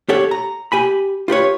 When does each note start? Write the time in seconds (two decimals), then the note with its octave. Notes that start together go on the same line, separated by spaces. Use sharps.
0.09 G4 A4 C#5 F#5
0.31 A#5
0.72 G4 G#5 B5
1.28 F4 G4 B4 C#5